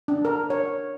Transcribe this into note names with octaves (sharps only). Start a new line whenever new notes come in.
D4
A#4
C#5